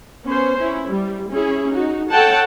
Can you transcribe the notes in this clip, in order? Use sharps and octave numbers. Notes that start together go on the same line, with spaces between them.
B3 C#4 C5
C#4 E4
G3
C#4 E4 G#4
D#4 F#4
A4 C#5 F#5 G5 A5